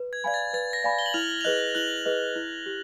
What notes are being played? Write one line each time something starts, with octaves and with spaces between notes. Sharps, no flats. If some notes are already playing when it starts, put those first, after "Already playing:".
Already playing: B4
G#6
D5 F5 G#5 B5 G#6
A6
B4 A6
A#6
D5 F5 G#5 B5
G7
F#7
E4 F6 F7
F7
G#4 B4 D#5 F#6 F#7
E4 F#6 F#7
G#4 B4 D#5
E4
G4